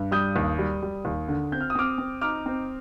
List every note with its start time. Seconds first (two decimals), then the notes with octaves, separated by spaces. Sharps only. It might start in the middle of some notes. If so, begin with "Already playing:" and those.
Already playing: G2
0.11 G3 D#6 G6
0.36 D#2
0.59 G3
0.82 G3
1.05 D#2
1.28 D3
1.52 C4 G6
1.61 F6
1.70 D#6
1.75 C4 D6 F6
1.98 C4
2.21 D#4 D6 F6
2.46 C4